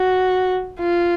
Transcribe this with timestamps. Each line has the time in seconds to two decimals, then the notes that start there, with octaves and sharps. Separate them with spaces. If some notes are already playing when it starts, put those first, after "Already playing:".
Already playing: F#4
0.80 F4